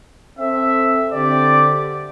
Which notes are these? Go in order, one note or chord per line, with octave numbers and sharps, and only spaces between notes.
C4 A4 E5
D3 C4 G4 D5